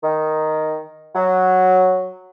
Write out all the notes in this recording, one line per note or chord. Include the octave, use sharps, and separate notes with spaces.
D#3
F#3